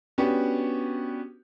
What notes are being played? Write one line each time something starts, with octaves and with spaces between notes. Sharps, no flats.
B3 C#4 D4 F#4 G4